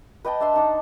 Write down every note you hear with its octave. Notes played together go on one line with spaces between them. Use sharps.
B4 D#5 G5 A5
D4 E5 C6
D4 D#4 F#5